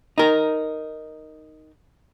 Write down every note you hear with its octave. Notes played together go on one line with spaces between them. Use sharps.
D#4 A#4